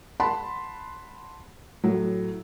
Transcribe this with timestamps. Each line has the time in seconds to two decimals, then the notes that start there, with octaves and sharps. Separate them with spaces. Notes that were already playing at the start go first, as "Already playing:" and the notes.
0.20 F#5 A5 B5 C6
1.84 A2 F#3